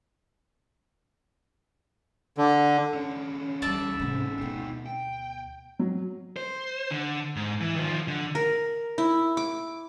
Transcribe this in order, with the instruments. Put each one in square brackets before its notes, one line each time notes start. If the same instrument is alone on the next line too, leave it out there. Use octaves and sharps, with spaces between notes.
[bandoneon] D3
[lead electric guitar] D3 C#4
[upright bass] D2 G3 [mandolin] D5 E5 A5
[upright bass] G#2 C3
[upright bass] D2 B2 [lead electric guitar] C4 D#4
[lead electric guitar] G5
[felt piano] F#3
[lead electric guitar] C5
D3
G#2
E3
D#3 F3
D3
[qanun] A#4
E4
D6